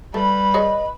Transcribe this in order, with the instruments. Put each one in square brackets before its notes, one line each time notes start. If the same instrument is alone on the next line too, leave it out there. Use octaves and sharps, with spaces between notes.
[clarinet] G3 [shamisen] A3 [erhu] B4
[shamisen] G#4 C5 C#5 [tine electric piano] D#5